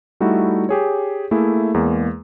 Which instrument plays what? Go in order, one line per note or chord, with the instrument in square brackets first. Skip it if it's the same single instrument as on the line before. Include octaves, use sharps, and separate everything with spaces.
[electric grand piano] G3 A3 D#4 E4 F#4
G4 G#4 C#5
A3 A#3 E4 G#4
E2 G#3 A#3